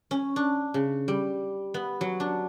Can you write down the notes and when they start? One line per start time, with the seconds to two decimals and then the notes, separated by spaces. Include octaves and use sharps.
0.11 C#4
0.36 D4
0.74 C#3
1.08 G3
1.74 B3
2.01 F#3
2.20 D4